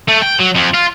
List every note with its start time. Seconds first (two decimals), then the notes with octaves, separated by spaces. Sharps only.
0.08 A3
0.23 G5
0.40 F#3
0.55 F2
0.74 F4